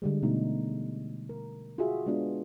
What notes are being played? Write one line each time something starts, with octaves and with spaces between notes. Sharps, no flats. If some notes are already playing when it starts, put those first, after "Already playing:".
D3 G3 G#3
B2 A3 D#4
A#4
F4 F#4 G#4 E5
G#3 B3 D4 F4 F#4